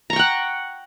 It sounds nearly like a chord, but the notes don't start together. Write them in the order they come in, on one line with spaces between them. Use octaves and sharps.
A#5 C#6 G5 F#5